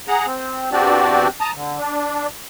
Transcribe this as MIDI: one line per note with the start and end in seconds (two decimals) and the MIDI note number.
0.08 0.26 68
0.08 0.26 78
0.08 0.26 82
0.26 0.70 60
0.72 1.28 40
0.72 1.28 60
0.72 1.28 62
0.72 1.28 66
0.72 1.28 67
0.72 1.28 74
1.41 1.51 81
1.41 1.51 82
1.41 1.51 87
1.55 1.78 50
1.78 2.27 62